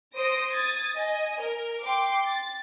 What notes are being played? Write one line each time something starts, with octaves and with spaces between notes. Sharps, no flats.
C5 D#6 A#6 D7
D#6 G#6 A6
D#5 G#5
A#4
G5 C6 D6
A6